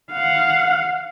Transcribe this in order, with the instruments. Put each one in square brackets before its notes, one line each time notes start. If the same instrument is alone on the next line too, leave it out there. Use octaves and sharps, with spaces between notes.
[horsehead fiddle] F5 F#5